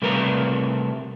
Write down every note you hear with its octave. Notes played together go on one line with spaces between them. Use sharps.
C3 G3 A3 A#4 B4 A#5